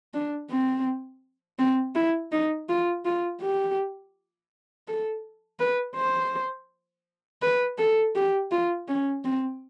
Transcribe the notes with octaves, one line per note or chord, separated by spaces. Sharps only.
D4
C4
C4
E4
D#4
F4
F4
G4
A4
B4
C5
B4
A4
G4
F4
C#4
C4